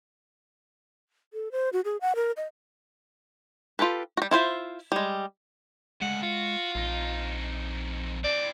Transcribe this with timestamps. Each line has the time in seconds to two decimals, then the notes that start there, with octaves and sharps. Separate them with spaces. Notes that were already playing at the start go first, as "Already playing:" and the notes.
1.33 A4
1.52 C5
1.73 F#4
1.85 G#4
2.01 F#5
2.15 A#4
2.37 D#5
3.79 F4 G4 A4 B4
4.17 G3 F#4
4.31 E4 F4 C5 E5
4.92 G3 G#3
6.02 D2 C#3 G#3 F#5
6.23 F4 F#4
6.75 A#1 F2 D#4
8.24 E3 C4 D5